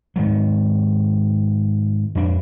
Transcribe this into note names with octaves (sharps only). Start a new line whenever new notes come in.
G#2 D#3 F#3
F2 D4